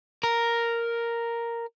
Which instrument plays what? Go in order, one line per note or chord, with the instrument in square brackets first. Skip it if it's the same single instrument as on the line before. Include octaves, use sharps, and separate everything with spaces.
[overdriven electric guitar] A#4